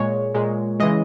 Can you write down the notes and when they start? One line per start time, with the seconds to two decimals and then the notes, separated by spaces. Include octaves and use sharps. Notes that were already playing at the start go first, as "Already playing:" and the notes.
Already playing: A#2 G#3 C#5
0.35 A#2 G#3
0.80 C#3 E3 G#3 D#5